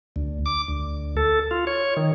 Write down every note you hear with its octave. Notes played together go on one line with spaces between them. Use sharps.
D2
D6
D2
A4
F4
C#5
D#3